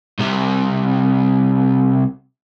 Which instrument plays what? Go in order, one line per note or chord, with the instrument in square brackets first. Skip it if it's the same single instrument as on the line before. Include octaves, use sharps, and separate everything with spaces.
[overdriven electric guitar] C2 C3